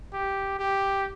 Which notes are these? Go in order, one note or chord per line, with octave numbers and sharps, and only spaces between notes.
G4
G4